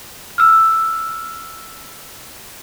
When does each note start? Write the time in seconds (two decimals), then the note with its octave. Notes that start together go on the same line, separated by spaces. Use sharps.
0.38 E6 F6